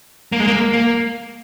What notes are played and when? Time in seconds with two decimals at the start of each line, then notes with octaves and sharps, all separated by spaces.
0.32 A#3
0.40 G#3
0.47 A#3
0.73 A#3